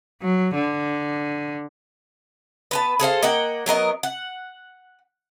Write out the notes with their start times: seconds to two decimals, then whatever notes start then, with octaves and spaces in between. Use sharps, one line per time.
0.22 F#3
0.54 D3
2.71 B3 B4 A5
3.00 G#4 A4 C5 F5
3.23 A#3 D#5 F#5 G5
3.66 F#3 B3 A#4 D#5
4.03 F#5